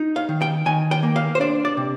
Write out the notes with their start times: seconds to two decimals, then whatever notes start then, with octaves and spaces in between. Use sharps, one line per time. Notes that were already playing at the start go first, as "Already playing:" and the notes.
Already playing: D#4
0.16 F5
0.29 D#3
0.42 G5
0.66 D#3 G#5
0.91 G5
1.03 A#3
1.16 F5
1.35 C5
1.40 D4 D5
1.65 D5
1.77 C3